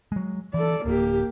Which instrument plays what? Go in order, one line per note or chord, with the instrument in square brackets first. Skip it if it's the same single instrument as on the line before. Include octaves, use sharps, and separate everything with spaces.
[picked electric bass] F#3 G#3
[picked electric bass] E3 [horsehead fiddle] A4 D5
[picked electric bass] D1 [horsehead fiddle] A#3 G4